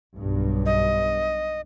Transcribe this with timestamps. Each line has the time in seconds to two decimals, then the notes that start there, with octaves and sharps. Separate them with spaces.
0.15 B1 G2
0.66 D#5